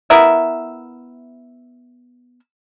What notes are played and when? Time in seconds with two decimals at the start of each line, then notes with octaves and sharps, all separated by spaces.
0.10 B3 E4 A#4 E5